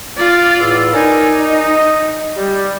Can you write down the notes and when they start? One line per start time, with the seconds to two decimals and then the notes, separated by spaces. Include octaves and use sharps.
0.17 F4 D5
0.59 E2 A2 E6
0.93 D#4 A#4 D5 G#5
1.39 D#5
2.36 G3